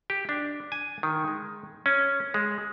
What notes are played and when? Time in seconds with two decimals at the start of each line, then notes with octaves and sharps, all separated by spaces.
0.10 G4
0.29 D4
0.72 G#5
1.03 D#3
1.28 G#3
1.86 C#4
2.34 G#3